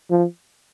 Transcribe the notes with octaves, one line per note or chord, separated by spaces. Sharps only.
F3